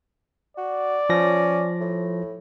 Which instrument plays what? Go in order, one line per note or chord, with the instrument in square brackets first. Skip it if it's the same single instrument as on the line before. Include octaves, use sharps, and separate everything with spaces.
[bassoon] F#4 [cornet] D5
[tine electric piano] F3 A#6 [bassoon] C#4
[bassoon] A2